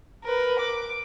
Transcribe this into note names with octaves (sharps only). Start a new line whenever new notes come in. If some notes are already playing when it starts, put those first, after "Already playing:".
A#4 B4
D6